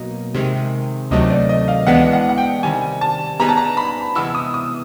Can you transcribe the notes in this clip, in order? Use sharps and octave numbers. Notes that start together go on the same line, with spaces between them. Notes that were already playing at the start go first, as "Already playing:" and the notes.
Already playing: B2 F#3 A#3 D#4
C3 D#3 G#3
D2 C3 D#3 F#3 A3 D#5
D5
D#5
F5
E3 G#3 B3 D4 F#5
F#5
F#5
G5
C3 D#3 G3 G#5
A5
G3 B3 D#4 G#4 B4 A#5
A5
A#5
B5
C3 E3 G#3 B3 E4 E6
D#6
D#6